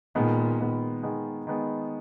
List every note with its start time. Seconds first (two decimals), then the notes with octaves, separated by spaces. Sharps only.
0.15 A#2 D#3 G#3 B3
0.59 D#3 G#3 B3
1.03 D#3 G#3 B3
1.47 D#3 G#3 B3